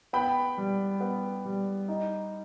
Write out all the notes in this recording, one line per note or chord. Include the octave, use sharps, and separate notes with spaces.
B3 G5 B5
G3
B3
G3
D#4